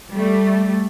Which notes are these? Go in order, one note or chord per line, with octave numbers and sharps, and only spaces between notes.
G3 A3